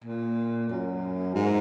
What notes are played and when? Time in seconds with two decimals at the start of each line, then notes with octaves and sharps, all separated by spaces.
0.04 A#2
0.70 F#2
1.35 G#2